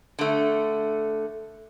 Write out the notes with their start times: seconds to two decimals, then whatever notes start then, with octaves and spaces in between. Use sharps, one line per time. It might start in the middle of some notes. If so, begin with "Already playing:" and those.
0.19 D3 A3